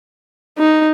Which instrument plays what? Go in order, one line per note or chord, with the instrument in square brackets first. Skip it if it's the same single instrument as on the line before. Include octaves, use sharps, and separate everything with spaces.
[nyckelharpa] D#4